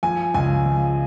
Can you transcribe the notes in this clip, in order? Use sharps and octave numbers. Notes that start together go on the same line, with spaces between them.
F3 G#5
C#2 G#5
F3